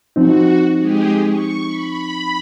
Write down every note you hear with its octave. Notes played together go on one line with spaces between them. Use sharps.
F3 C4 D#4 F#4
G#3 G4 G#4
C#6
B5